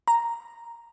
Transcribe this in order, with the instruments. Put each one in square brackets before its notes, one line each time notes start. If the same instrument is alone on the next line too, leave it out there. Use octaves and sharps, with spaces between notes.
[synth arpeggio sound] A#5